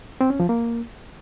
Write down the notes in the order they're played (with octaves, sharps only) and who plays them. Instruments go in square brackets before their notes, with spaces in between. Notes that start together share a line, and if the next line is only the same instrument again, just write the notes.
[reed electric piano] C4
C#4
F3
A#3